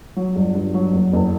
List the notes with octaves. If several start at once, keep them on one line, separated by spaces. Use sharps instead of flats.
F#3
G1
G2
F#3
F#1
F#1